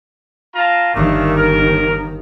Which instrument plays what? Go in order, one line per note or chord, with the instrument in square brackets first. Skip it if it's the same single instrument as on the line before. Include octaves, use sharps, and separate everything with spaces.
[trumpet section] F4 A5 A#5
[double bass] G1 D#3 [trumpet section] A3 A#3 D4
[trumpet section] A#4